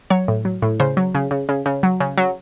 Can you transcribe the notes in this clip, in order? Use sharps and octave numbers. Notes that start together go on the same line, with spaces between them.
F#3 C#5
A2
F#3
A2
C#3 C5
F#3
C#3
C#3
C#3
C#3
F#3
C#3
F#3